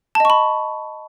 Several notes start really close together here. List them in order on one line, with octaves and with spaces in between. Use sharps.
A5 D#5 C#6 B5